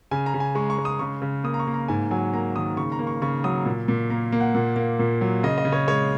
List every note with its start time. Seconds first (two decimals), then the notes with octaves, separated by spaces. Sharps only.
0.11 C#3 G#5
0.26 A#5
0.34 C#3
0.40 G#5
0.55 G#3 C#6
0.70 C#6
0.78 G#3
0.85 D#6
0.99 C#3 C#6
1.22 C#3
1.44 A#3 D#6
1.54 A#5
1.59 C#6
1.67 A#3
1.74 A#5
1.88 G#2 G#5
2.11 F#3 G#5
2.34 A#3 A#5
2.55 D#3 D#6
2.77 C#3 C#6
2.92 A#5
2.99 A#3
3.07 C#6
3.22 C#3 C#6
3.44 F#3 D#6
3.65 A#2
3.88 A#2
4.10 A#3 A#5
4.32 A#3
4.40 F#5
4.55 A#2 F#5
4.76 A#3
4.99 A#2
5.21 F#3
5.43 C#3 D#5
5.58 D#5
5.65 C#3
5.72 C#5
5.88 G#3 C#5